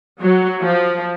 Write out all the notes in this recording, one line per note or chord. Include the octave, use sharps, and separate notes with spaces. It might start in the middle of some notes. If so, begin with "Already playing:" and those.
F#3
F3